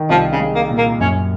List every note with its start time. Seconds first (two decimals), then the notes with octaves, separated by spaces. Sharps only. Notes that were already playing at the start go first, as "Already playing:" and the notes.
Already playing: D#3
0.09 C2 F3
0.32 C#3
0.40 G#3
0.55 A#3
0.70 A#2
0.78 A#3
1.00 F#2 C#4